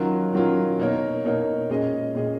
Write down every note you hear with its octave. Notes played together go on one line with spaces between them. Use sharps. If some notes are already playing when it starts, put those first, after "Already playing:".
Already playing: D#3 F#3 C#4 F4 A#4
D#3 F#3 C#4 F4 A#4
B2 A#3 D#4 A#4 C#5
B2 A#3 D#4 A#4 C#5
A#2 G#3 C#4 G#4 D#5
A#2 G#3 C#4 G#4 D#5